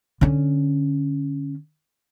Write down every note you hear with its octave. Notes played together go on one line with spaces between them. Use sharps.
D3 C#4